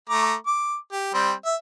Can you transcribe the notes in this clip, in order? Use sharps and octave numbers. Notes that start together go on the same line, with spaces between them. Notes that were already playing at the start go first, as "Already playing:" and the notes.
A3 A#5 D6
D6
G4
G3 C4
E5